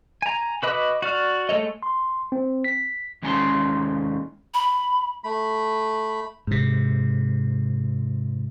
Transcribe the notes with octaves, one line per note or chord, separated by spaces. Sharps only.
G#5 A#5
F#4 B4 D#5 B5 D6
F#4 D5 F6
G#3 A3 A4 C#5 D#5
C6
C4
B6
D#2 G#3 C#4 A5 B5 C6
B5
A3 B5
G#2 C3